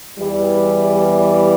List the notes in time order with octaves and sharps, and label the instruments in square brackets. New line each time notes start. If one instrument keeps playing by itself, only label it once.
[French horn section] E2 E3 G3